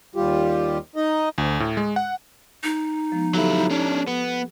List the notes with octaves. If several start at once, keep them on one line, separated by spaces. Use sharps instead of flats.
D#2 G3 F4 G4
D#4 D#5
D2
A2
G#3
F#5
D#4
F3 G#3 B3
F#3 E4 G4 A4
C#4 D4
B3